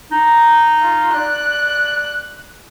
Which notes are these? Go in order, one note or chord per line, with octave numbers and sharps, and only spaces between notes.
D#4
F4
D5 F#6